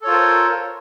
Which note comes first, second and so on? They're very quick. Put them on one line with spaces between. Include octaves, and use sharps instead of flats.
A4 C#5 F4 C5 A#4